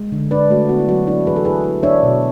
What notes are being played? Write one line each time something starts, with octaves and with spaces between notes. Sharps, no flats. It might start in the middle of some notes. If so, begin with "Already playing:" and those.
Already playing: G#3
D3
D4 B4 D5
A3 F#4
B3 F#4
E4
F#3 F#4
D4 E4
E3 G#4 B4
F#4 A4
E4 G#4 B4
E4
D4 C#5 E5
B2